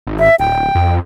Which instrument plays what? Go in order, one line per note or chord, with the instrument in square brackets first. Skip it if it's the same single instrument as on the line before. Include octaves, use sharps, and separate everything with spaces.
[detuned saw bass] G#1
[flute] E5
[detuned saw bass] D1 [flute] G5
[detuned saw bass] F2